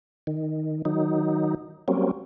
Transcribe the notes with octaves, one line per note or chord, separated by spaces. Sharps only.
D#3
D#3 F#3 D#4
F#3 G3 A#3 C4 C#4